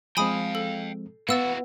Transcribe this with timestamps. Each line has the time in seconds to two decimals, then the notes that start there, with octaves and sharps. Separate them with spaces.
0.17 F3 G#3 C4 F5 G5 G#5 B5 D#6
0.55 A4
1.29 B3 E4 F#4 F5 E6 A6